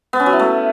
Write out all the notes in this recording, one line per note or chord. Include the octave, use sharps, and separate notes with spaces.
B3
C#4
F#3
E4
A3